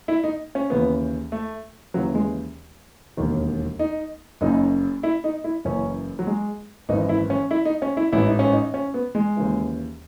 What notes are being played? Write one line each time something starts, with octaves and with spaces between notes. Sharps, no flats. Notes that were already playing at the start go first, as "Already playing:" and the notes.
E4
D#4
C#4
D#2 C#3 E3 B3
A3
D#2 C#3 E3 F#3
G#3
E1 D#2 D#3
D#4
F#1 F#2 C#3 D#4
E4
D#4
E4
F#1 F#2 C#3 E3 C#4
F#3
G#3
G#1 F#2 E3 D#4
E4
C#4
E4
D#4
C#4
E4
A1 G#2 E3 E4
D#4
C#4
D#4
C#4
B3
G#3
D#2 C#3 E3